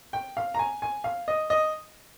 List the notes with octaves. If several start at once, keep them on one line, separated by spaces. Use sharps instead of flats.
G5
F5
A#5
G#5
G#5
F5
D#5
D#5